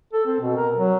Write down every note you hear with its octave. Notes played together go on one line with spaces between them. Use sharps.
A4
C4
B2
A#4
F#3